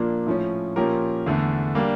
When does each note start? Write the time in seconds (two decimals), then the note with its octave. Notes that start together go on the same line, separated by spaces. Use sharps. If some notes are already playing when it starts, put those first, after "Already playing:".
Already playing: A#2 F3 A#3 D4 F4
0.26 A2 F3 C#4
0.76 A#2 F3 C#4 G4 A#4
1.26 E2 D3 A3
1.75 G3 A#3 D4